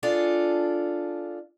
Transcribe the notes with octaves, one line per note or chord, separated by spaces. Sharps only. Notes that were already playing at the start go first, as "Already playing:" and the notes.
D4 F4 G#4 A4